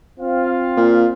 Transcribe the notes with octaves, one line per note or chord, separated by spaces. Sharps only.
C4 F4 F5
A#2